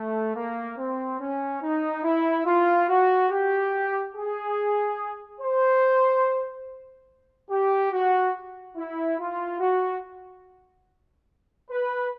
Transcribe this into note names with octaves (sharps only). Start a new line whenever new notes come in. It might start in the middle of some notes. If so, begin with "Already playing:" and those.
Already playing: A3
A#3
C4
C#4
D#4
E4
F4
F#4
G4
G#4
C5
G4
F#4
E4
F4
F#4
B4